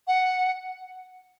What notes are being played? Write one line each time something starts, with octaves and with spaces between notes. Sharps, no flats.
F#5